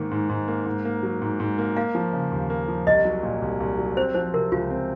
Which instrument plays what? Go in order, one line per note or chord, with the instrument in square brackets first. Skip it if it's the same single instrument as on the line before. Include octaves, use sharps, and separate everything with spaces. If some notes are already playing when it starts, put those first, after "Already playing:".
Already playing: [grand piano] G#2 D#3 A#3
G#2
G#2
A#3
G#2
A#3
F#3
G#2
G#2
A#3
[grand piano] A#3 [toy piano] F5
[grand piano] F3
C#3
D#2
A#3
F3
[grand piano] C2 [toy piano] D#5
[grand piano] F#3
A#2
C2
C2
F#3
[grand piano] C4 [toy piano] C5
[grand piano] F3 [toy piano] C5
[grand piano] C3 [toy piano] A#4
[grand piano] C#2 [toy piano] F4
[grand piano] C4